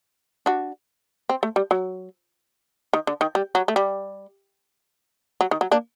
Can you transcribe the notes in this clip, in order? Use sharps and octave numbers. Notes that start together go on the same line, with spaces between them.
D4 F#4
C4
A3
G3
F#3
D#3
D3
D#3
G3
F#3
A3
G3
F#3
D#3
F#3
A#3 D4